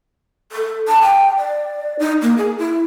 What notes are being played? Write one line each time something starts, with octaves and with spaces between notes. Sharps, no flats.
A4
A5
G5
D5
D#4
A#3
G#4
E4